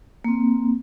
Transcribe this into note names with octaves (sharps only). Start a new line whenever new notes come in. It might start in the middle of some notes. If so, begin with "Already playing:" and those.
A#3 C4